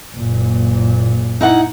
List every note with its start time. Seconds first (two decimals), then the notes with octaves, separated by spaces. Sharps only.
0.15 F#1 A#2
1.41 D#4 E4 F#5